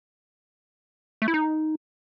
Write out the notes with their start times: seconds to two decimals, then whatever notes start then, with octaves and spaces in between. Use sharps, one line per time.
1.22 A3
1.28 E4
1.34 D#4